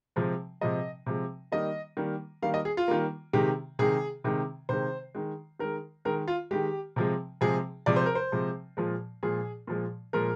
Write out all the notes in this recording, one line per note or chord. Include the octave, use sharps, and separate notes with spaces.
C3 F3 G#3
C3 F3 G#3 D#5
C3 F3 G#3
D#3 G3 A#3 D#5
D#3 G3 A#3
D#3 G3 A#3 F5
D#5
G#4
F4
D#3 G3 A#3
C3 D#3 G#3 G4
C3 D#3 G#3 G#4
C3 D#3 G#3
C3 D#3 G#3 C5
D#3 G#3
D#3 G#3 A#4
D#3 G#3 A#4
F4
D#3 G#3 G4
C3 F3 G#3
C3 F3 G#3 G#4
C3 F3 G#3 D5
C5
A#4
C5
C3 F3 G#3
A#2 F3 G#3
A#2 F3 G#3 G#4
A#2 F3 G#3
A#2 F3 G#3 A#4